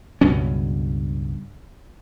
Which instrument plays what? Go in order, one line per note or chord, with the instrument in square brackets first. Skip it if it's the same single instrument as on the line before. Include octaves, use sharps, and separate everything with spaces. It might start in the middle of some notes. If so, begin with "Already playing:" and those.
[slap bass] C#2 G2 B2 C#4